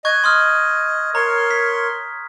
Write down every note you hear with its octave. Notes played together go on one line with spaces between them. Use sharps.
D#5 C#6 F#6 G#6
C6 D#6 F6
A#4 C#5 A#5 C6
B6